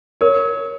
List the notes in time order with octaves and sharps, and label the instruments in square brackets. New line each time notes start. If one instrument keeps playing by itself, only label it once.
[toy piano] A#4 [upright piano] C#5